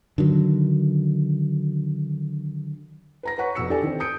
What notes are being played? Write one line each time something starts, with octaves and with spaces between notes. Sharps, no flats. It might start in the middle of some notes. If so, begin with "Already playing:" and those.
D3 D#3 F#3
B4 A#5 A#6
B4 C#5 F#5 C#6 B6
F1 B2 E6 C#7
D4 G4 A4 D5 G#5
D#3 C4
D#6 E6 G6 C#7 D7